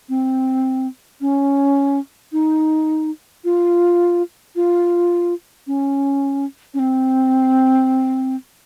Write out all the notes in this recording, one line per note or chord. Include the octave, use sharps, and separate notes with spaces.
C4
C#4
D#4
F4
F4
C#4
C#4
C4